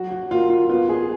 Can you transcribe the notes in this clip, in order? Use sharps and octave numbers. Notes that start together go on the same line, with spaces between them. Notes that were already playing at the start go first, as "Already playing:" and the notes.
Already playing: F#3 F#4
F#4
A#3 F4
F4
B3 F4
G#4